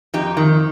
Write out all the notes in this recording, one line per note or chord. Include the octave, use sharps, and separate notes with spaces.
F2 D#4 G4
D#3